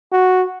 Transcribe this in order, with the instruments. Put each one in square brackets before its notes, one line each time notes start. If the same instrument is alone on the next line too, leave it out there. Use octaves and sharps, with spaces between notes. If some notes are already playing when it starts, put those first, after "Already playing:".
[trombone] F#4